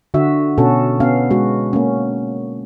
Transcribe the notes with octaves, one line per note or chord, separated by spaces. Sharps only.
D3 F#4 E5
B2 C#4 F#4 A4
B3 C#4 F5
G#3 F#4
A#3 C#4